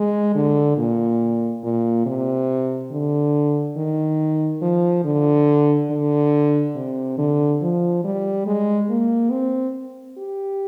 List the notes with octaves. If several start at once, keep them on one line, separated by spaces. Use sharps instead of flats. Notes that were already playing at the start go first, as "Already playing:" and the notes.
Already playing: G#3
D3
A#2
A#2
C3
D3
D#3
F3
D3
D3
C3
D3
F3
G3
G#3
A#3
C4
G4